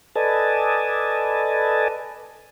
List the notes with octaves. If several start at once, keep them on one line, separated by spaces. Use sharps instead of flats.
A4 B4 D5 D#5 G#5 A5